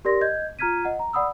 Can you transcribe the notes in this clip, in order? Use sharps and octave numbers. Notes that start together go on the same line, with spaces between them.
G4 A#4 D5 C6 A#6
D#5 G6 G#6
F4 A#5 F6 G#6 B6 D#7
D#5 F#5
A#5
D5 F#5 B5 D#6 E6